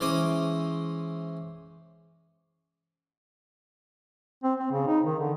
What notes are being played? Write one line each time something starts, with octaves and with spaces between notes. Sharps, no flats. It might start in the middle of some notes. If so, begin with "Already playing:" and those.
E3 G#3 C#4 C5 D6 D#6
C4
C4
C#3
D#4
D#3
D3